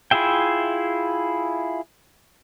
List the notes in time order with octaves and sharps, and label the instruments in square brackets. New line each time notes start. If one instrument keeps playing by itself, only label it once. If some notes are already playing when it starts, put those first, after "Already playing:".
[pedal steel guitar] E4 F4 G#4 E5 G5